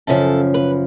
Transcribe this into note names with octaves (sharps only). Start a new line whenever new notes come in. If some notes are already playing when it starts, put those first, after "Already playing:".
F#2 C#3 F3 A4
B4